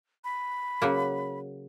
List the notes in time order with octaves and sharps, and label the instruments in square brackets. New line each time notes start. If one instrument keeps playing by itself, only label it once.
[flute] B5
[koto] C#3 F#3 A#3